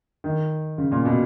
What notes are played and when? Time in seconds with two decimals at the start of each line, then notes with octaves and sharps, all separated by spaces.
0.24 D#3
0.78 C#3
0.91 A#2
1.05 B2